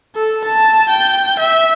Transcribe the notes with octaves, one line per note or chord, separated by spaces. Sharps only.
A4
A5
G5
E5